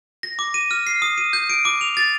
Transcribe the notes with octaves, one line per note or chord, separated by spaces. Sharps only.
A#6
D6
D#7
F6
C7
D#6
D#7
G6
D7
D6
F7
A6